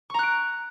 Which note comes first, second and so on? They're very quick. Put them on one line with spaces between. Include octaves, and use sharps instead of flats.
C#6 A#5 F#6 D7